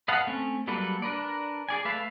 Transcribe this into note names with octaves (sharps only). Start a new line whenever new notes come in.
B4 D#5 F5 F#5 A5
A3 C4 C#4
F#3 G3 A#3 A4 B4
D4 A#4 B4 D5
G#4 D5 G#5
A3 B4 E5 F5 A5